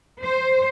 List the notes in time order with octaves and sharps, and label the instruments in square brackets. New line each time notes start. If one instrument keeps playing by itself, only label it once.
[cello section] C5